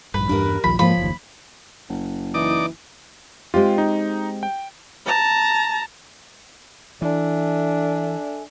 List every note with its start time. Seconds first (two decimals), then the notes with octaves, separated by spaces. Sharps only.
0.14 A#1 G2 B4
0.29 E2 G2 G3 D4 A#4
0.64 A#1 D#2 F3 B5
0.79 G#2 F3 F#3 A#3 C#5 B5
0.97 F#1 D#2
1.89 F#1
2.34 E3 D#4 D5 D6
3.54 G#3 C4 F4 G4
3.78 D#4
4.43 G5
5.06 A5 A#5
7.02 E3 D4 A4 E5 G#5